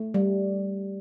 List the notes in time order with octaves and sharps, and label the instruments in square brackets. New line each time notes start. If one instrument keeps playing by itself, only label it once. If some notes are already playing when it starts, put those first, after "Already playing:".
Already playing: [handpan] A3
G3